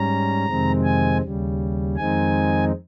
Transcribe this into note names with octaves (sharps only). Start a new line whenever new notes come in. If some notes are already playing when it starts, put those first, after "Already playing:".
Already playing: G#2 G3 C#4 A#5
F2 C3 D#3 G#3 C4
G#5
D#2 C#3 G3
F2 D#3 G#3 C4 D#4 G#5